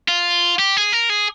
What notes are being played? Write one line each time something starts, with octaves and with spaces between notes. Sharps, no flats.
F4
G4
G#4
A#4
G#4